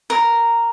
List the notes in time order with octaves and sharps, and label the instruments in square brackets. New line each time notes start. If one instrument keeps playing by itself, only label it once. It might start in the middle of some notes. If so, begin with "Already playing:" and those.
[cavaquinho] A#4